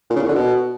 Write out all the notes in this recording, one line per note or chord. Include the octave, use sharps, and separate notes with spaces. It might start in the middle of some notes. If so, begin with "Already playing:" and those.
A#2
C#3
E2
D3
B2